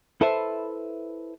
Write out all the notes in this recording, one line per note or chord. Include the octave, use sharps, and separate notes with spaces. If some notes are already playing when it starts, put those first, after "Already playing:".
E4 A4 B4 C5 E5